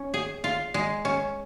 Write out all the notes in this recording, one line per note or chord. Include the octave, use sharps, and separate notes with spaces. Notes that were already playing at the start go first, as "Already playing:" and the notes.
Already playing: C#4
G#4
F4
G#3
C#4